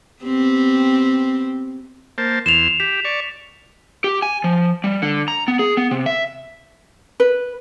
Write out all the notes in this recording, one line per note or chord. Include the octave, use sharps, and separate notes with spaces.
B3 C4 G4
A#3 C5 A5
E2 C6 E7 F7
G4 B6
D5 C#6
G4
G#5
F3
G3
D3
A#5
B3
G#4
B3
C3
E5
B4